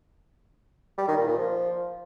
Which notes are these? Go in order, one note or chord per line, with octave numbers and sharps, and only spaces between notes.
G3
D#3
A#2
A#2
F3